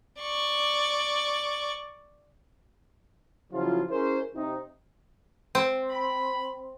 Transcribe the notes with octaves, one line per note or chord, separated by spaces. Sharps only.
D5 C#6
C#3 F3 F#3 E4 F4
C#4 E4 G#4 A#4 C5
C3 D#4
C4
B5